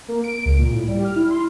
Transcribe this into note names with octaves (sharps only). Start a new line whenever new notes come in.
A#3
D7
C#2
A#2
A2
G3
F6
E4
C6